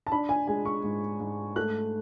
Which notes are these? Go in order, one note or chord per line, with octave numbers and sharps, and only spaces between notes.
A5
D4 B5
G#5
G#3 G#5
C#6
G#2
G#2
A3 F#6